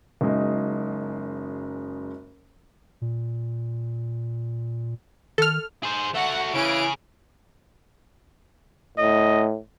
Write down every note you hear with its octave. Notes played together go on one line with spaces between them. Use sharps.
F#1 F#2 G#3 D#4
A#2
D#3 A4 F6
G#4 C5
A3 F#4 F#5
C#3 E3 C#4 G#4 D7
A2 D#5